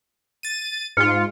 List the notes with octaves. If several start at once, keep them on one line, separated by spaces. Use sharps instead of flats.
A6 D#7
G#2 F4 F6 C#7